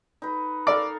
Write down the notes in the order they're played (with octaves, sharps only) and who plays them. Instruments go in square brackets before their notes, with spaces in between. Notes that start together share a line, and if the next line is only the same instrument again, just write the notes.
[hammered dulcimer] D#4 B4
[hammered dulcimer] A4 A#4 F5 [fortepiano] D5